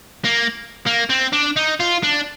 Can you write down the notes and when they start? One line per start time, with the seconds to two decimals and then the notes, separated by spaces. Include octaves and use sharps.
0.24 A#3
0.86 A#3
1.10 C4
1.33 D4
1.56 D#4
1.80 F4
2.03 D4